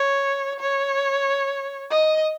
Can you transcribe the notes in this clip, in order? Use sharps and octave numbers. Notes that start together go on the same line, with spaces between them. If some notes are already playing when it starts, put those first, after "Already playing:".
Already playing: C#5
C#5
D#5